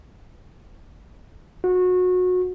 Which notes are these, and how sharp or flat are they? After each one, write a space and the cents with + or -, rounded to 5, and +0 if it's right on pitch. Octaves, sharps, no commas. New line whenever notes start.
F#4 -25